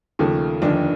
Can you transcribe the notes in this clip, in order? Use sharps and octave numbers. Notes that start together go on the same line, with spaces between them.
D#2 C#3 F3 A3
F1 D#2 D3 F3 D4